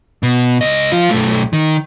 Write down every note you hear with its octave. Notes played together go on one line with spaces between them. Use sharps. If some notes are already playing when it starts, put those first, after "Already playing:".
B2
C#2 D#5
F3 F4
B1 A3
D#3